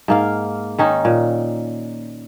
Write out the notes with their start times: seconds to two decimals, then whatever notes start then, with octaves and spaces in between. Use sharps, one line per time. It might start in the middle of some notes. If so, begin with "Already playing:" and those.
0.08 G#2 A#3 F5
0.79 D#3 C#4 D#4
1.05 A#2